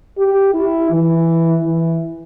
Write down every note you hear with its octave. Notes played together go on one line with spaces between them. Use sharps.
G4
E4
E3
E3